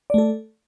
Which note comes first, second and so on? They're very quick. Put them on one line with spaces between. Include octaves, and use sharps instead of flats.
D5 A3 A4